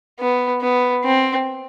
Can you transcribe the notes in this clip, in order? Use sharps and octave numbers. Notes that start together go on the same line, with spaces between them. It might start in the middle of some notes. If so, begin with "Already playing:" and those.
B3
B3
C4